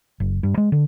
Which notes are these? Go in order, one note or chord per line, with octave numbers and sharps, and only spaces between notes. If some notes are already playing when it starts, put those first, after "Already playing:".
F#1
G2
G#3
D3